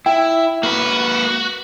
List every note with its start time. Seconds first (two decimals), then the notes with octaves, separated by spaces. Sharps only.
0.06 E4 G5
0.63 A#3 F#4 B4